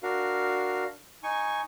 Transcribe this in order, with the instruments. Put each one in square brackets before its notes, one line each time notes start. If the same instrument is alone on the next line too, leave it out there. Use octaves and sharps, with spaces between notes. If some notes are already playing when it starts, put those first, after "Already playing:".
[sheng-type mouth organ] D4 F#4 A#4 F5
D#4 G#5 C#6